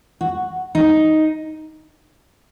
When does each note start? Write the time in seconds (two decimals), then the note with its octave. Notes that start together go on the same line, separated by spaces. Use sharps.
0.21 F#4
0.75 D#4